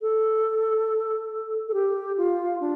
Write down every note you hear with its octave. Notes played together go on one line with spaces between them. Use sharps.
A4
A4
G4
F4
D4